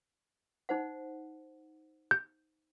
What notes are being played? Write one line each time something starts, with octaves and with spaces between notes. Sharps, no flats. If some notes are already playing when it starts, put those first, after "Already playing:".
D#4 C5 F#5
G6